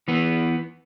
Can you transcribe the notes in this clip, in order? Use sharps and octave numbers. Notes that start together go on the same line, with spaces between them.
E3 B3